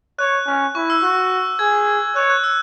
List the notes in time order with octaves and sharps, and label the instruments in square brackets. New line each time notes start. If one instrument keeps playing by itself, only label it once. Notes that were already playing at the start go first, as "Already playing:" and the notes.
[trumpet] C#5 [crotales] F#6
[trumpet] C#4
[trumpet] E4 [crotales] C#6
[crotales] E6
[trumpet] F#4 [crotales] F#6
[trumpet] G#4 [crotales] G#6
[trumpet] C#5 [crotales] F#6
[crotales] F#6
E6